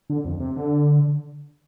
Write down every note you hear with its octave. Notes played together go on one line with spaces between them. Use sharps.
D3
F2
C3
D3